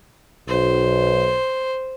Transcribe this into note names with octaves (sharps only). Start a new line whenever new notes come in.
B1 C5